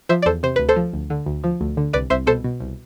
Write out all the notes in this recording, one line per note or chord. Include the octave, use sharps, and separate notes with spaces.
F3 C5 E5
D5
E2 A4 C5
C3 C5
D2 B4
A4 C5
F3
D2
D3
D2
F3
D2
D3
C2 B4 D5
C2 C5 E5
B2 A4 C5
B2
C2